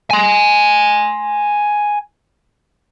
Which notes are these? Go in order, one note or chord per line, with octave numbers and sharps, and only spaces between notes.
G#5 C6